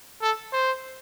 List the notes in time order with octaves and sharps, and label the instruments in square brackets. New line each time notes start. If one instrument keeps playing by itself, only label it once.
[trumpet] A4
C5